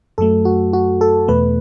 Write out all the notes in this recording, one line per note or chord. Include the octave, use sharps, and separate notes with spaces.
F#2 F#3 A3 A4
F#4
F#4
A4
E2 B2 A3 B4